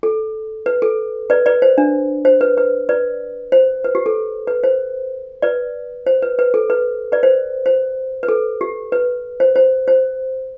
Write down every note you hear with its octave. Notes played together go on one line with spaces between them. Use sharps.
A4
B4
A4
B4 D5
B4 D5
C5
D4
C5
B4
B4
B4 D5
C5
B4
G4
A4
B4
C5
B4 D5
C5
B4
B4
A4
B4
B4 D5
C5
C5
B4
A4
G4
B4
C5
C5
C5